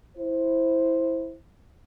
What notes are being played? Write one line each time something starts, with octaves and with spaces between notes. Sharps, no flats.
E4 C5